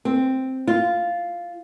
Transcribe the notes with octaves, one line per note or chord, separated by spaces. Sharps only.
C4
F4